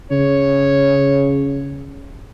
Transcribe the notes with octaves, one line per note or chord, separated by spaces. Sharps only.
C#3 C#5